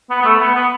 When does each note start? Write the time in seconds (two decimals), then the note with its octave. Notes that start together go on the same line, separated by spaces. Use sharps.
0.10 B3
0.22 B3
0.25 A3
0.40 B3
0.54 B3